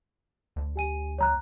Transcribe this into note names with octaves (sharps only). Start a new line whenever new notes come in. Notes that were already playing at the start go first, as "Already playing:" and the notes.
D2
G4 G#5 D#7
C#5 A#5 F#6